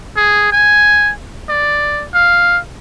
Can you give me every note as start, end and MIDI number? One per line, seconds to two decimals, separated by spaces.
0.16 0.50 68
0.52 1.12 80
1.49 2.04 74
2.14 2.59 77